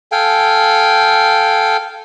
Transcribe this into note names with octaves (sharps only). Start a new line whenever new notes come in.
A4 F5 G5 G#5